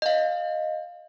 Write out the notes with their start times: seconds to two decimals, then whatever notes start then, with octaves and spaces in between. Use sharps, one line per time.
0.02 D#5 F5